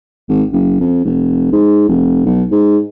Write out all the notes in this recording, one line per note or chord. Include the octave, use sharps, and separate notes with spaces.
G#1
F#1
F2
F1
G#2
F1
B1
G#2